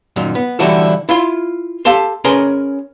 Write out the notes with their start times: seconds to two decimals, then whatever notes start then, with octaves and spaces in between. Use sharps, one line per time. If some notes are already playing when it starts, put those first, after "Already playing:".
0.16 F#2 A#2 D#3
0.35 B3
0.59 D3 E3 G3 E4 F#4 A4
1.09 E4 F4 C6
1.85 G4 A4 F5 A5 C6
2.24 C#4 G#4 A#4 B4 A#5 C6